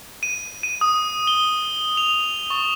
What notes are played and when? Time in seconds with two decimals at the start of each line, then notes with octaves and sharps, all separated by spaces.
0.23 D#7
0.63 D#7
0.81 D#6
1.27 G7
1.97 F7
2.50 C#6